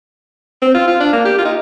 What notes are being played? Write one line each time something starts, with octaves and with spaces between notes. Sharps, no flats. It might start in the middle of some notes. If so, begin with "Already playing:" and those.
C4
F4
F4
D4
A#3
G4
F4
D#4